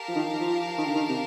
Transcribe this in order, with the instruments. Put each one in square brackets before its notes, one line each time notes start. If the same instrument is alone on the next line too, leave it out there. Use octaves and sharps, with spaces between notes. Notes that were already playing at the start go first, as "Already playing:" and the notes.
Already playing: [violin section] G4 A#4 F5 A5
[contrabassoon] F3
D#3
F3
D#3
D3
D#3
C3